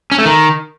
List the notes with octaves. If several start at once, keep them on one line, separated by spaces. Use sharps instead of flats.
C#4
A3
D#3